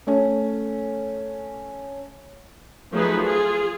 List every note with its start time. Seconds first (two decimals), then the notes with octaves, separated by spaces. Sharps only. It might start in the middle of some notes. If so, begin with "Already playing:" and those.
0.07 A3 C#4
2.91 F3 F#3 A3 D#4 G#4 B4
3.22 F4 G#4